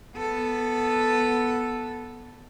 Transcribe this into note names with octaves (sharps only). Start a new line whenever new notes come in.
B3 A4